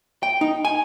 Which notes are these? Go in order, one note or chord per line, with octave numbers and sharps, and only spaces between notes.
G5
D#4
G#5